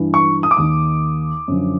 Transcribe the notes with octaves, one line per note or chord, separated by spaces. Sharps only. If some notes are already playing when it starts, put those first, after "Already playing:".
Already playing: G2 E3
C#6
D#6
D6
D#2 D#3 D#6
F#2 D3 F3